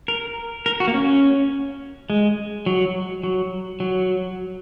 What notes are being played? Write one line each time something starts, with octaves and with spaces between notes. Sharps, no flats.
A#4
A#4
F#4
A#3
C#4
G#3
F#3
F#3
F#3